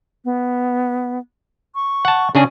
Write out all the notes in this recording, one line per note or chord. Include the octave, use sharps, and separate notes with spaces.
B3
C#6
F#5 A5
C#3 C#4 D4 G#4